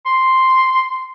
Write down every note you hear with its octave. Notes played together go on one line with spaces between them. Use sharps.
C6